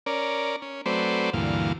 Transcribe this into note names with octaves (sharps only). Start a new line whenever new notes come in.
C#4 A#4 D5
C#4
F#3 A3 C4 B4 C5 D5
D2 G2 A#2 E3 F5